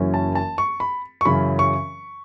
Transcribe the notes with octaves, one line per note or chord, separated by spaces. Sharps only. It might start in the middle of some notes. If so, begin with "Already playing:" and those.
Already playing: F#1 F#2 E3 C#4
A5
A5
C#6
B5
C#6
F#2 C#3 E3 C#4 B5
C#6